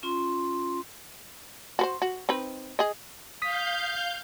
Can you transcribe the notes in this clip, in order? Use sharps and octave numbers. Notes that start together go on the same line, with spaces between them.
C#4 F4 C6
F#4 B4 C5
F#4
C4 D#4 B4
G#4 D#5
F5 D#6 G6 B6